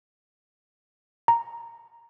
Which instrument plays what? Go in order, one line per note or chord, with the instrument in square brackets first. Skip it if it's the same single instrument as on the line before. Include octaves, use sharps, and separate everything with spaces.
[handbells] A#5